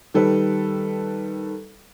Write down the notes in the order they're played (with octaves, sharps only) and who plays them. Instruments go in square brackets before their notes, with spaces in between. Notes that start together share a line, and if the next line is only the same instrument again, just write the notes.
[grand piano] D#3 G3 A4 B4